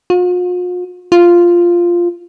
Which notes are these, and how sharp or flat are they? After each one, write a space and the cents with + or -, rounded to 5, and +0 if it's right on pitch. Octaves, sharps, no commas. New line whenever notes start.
F4 +45
F4 -5